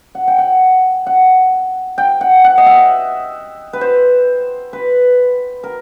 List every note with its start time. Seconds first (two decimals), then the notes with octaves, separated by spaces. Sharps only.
0.15 F#5
0.28 G5
0.38 F#5
1.06 F#5
1.98 G5
2.21 F#5
2.44 F#5
2.58 D#5
2.66 E5
3.73 B4
3.81 C5
4.73 B4
5.64 A#4